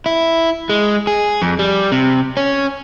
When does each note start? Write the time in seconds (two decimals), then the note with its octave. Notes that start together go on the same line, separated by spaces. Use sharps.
0.06 E4
0.69 G#3
1.07 G#4
1.42 F2
1.59 G3
1.92 C3
2.37 C#4